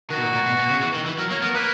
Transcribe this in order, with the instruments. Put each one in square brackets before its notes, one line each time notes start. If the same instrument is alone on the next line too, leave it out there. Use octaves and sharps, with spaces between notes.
[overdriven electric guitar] D#3 [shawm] F#4
[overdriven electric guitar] B2
A#2
A#2
B2
B2
C#3
E3
D#3
E3
[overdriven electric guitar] F#3 [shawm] A#4
[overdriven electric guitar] A#3 [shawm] C#5
[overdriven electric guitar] B3 [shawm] A#4
[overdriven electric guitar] A#3 [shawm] B4